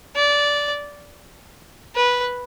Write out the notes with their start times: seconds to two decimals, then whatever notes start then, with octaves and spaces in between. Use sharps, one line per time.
0.16 D5
1.95 B4